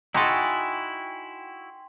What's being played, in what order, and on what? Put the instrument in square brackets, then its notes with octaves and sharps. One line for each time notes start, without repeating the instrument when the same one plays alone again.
[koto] D#4 A4 [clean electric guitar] E4 F#4 [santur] G5 G#5 C6